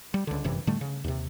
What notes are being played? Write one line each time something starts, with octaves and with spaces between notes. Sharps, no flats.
G3
C#2 D3
G1 F#2 C3 E3
A2 D3 G3 A3
C#3
D#2 C3